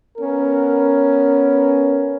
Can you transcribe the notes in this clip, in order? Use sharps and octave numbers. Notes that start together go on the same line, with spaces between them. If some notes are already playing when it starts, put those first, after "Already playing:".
B3 C#4 A#4